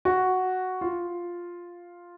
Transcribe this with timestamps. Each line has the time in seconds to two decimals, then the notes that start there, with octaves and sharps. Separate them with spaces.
0.05 F#4
0.81 F4